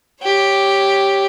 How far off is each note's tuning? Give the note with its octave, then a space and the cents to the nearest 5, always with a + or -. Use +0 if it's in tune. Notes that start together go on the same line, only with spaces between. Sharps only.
G4 +0 C#5 +0